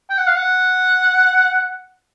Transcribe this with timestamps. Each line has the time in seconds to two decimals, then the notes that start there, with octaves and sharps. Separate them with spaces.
0.10 G5
0.18 F#5
0.27 F5
0.36 F#5